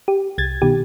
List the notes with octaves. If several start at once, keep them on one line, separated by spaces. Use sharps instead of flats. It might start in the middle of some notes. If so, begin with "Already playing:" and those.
G4
C2 G#6 A6
B2 D#3 G4